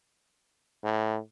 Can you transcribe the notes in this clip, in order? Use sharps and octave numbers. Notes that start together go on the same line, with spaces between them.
A2